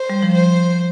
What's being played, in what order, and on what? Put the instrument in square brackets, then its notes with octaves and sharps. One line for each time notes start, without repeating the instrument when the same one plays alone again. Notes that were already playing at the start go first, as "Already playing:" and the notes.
Already playing: [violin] C5
[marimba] G3
F3
[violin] C5